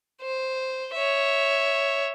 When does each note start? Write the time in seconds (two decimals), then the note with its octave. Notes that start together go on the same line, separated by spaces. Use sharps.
0.22 C5
0.94 C#5 E5